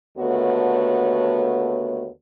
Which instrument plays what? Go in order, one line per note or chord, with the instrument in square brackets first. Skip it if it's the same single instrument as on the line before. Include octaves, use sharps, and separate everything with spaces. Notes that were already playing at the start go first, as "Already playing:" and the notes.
[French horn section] D#2 D3 A3 B3 F#4 C#5